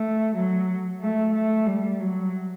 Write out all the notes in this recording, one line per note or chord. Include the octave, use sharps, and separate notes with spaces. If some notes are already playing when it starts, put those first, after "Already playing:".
Already playing: A3
F#3
A3
A3
G3
F#3